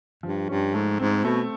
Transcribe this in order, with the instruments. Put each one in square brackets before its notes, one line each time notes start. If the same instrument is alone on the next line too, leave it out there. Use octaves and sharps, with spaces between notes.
[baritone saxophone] G2 [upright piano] F3
[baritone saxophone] G2 [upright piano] C#4
[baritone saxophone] G#2 [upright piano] A3
[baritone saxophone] G#2 [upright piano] C4
[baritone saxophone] B2 [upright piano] A3